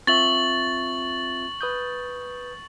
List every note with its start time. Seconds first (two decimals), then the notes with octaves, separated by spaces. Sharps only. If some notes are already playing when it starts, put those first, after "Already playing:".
0.07 C4 F4 E5 C#6 A6 F#7
1.61 B4 D#6 G6